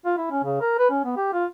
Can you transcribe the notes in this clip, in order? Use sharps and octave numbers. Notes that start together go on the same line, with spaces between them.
F4
E4
C#4
C#3
A#4
B4
C#4
B3
G4
F4